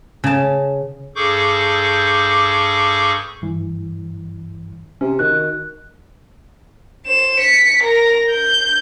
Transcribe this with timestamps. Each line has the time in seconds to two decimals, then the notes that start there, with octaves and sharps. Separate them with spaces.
0.24 C#3 A5
1.16 G2 G#4 A4 C#6 D6 G6
3.42 G2 E3
5.01 C3 C#4
5.19 D#3 F#4 F#6
7.06 C5 E7
7.39 B6 C#7
7.83 A#4 A#5
8.31 G6